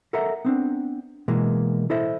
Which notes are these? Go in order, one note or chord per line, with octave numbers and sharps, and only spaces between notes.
A4 A#4 D#5 E5 F#5 A#5
B3 C4 D4
B2 E3 G#3 A#3
E4 A4 C5 D#5 E5